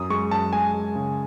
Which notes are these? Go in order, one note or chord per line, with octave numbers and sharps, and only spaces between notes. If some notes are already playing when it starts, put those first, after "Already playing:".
Already playing: F#2 D#6
G#3 C#6
F#2 A5
G#3 G#5
G#3
C#3